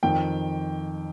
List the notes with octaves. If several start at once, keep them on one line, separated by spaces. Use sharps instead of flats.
F2 D#3 G5